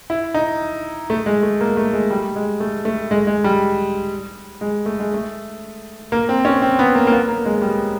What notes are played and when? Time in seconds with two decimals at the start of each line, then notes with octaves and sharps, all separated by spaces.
0.10 E4
0.34 D#4
1.10 A3
1.26 G#3
1.43 A3
1.61 A#3
1.77 A3
1.93 G#3
2.10 G3
2.36 G#3
2.60 A3
2.85 A3
3.11 G#3
3.27 G#3
3.44 G3
4.61 G#3
4.86 A3
5.00 G#3
5.14 A3
6.12 A#3
6.29 C4
6.45 C#4
6.62 C4
6.79 B3
6.95 A#3
7.07 A#3
7.12 B3
7.28 A#3
7.46 G#3
7.62 G3